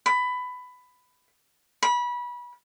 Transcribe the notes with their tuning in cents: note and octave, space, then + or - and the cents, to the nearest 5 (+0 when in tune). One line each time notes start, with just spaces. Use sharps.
B5 +15
B5 -25